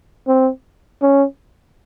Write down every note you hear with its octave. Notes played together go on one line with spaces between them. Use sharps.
C4
C#4